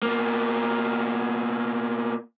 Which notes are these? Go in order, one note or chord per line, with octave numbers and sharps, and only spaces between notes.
B2 A#3